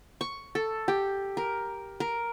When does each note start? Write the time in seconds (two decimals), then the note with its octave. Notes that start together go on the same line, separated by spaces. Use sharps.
0.21 C#6
0.55 A4
0.88 G4
1.37 A#4
2.00 A#4